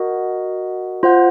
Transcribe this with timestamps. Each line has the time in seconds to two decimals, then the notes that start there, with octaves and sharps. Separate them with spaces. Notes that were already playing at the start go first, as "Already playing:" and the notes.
Already playing: F#4 A#4 D#5 F#5
1.03 F4 C5 F#5